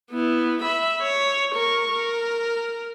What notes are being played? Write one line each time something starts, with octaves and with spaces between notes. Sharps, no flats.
B3 E4
E5 B5
C#5
A#4 C#6
A#4